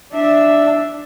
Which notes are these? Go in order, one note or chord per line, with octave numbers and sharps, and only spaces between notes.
D4 E5